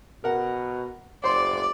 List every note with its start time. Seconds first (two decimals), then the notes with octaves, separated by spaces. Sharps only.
0.24 B2 A#4 F#5
1.24 F#1 C5 D5 C6